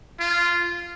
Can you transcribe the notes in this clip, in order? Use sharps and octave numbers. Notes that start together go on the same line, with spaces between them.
F4